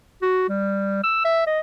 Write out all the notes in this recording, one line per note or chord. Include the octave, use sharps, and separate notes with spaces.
F#4
G3
E6
E5
D#5